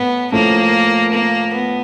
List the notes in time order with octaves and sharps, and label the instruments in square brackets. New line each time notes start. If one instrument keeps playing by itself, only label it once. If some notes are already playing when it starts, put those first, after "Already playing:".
Already playing: [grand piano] A2 [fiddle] B3
[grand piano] A2 F3 A3 [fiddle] A#3
[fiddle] A#3
B3